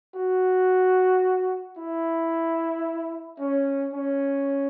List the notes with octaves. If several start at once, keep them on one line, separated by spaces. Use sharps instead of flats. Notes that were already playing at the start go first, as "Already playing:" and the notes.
F#4
E4
C#4
C#4